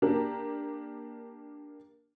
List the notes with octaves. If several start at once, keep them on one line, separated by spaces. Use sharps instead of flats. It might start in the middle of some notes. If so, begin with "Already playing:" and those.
A#3 D4 G4 A#4